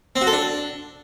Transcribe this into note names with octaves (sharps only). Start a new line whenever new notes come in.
C4
F#4
A4
D4